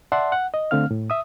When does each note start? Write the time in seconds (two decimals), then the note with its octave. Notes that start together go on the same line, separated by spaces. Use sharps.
0.12 D5 E5 F#5 A5 C6
0.32 F#5
0.54 D#5
0.71 D3 A3 C4 F5 F6
0.91 A2
1.10 E5 D#6